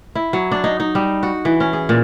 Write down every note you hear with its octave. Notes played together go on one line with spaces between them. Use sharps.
E4
F#3
D4
D#4
D#4
G3
F#4
E3
C#4
G#4
A#2